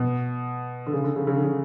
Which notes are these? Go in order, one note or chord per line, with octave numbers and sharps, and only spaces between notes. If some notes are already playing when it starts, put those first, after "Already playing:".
Already playing: B2
D3
C#3
D3
C#3
C#3
D3
C#3